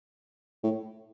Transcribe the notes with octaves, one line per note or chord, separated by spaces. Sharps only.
A2